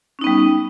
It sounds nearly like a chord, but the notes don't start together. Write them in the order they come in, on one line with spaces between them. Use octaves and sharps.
C#4 D#4 B3 G3